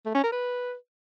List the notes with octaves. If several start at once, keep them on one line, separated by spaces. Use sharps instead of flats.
A3
C#4
A#4
B4